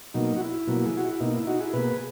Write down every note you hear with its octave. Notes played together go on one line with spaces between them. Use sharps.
B2 F#3 A#3 D#4
F#4
E4
B2 F#3 A#3
G#4
F#4
E4
B2 A#3 D#4
E4
D#4 F#4
E4 G#4
B2 A#3 G#4 B4